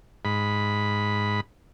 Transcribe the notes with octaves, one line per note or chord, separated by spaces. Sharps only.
G#2 B5